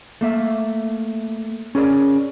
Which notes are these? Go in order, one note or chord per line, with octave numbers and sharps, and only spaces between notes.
A3 A#3 E5
C#4 G#4 A#4 D5